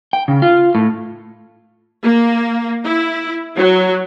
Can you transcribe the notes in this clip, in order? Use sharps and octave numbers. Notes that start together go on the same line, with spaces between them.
G5
C#3
F4
A2
A#3
E4
F#3